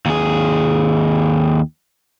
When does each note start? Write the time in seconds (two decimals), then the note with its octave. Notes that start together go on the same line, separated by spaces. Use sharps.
0.06 D#2 G#4